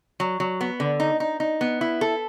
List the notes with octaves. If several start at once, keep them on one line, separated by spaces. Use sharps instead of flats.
F#3
F#3
B3
D3
D#4
D#4
D#4
B3
E4
A4